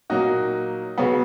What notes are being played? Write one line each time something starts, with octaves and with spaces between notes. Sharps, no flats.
A#2 F#3 A#3 D#4 F#4
C#3 F#3 B3